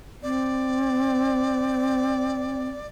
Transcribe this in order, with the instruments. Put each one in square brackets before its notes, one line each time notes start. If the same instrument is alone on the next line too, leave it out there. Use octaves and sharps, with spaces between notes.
[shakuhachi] C4 [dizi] D5